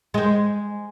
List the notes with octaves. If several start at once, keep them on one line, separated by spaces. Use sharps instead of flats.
G#3 C5